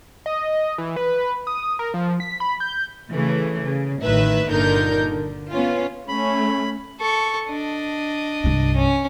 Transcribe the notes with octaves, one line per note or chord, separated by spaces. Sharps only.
D#5
E3
B4
D#6
A#4
F3
B6
B5
G6
C#3 E3 A3
C#3
A1 A2 D#3 B4 E5
G1 A#2 D3 D#4 A#4 G6
D3
B3 C#4 F4
A3 C#4 B5
A4 C#6
D4 D#5
C2 G2
C#4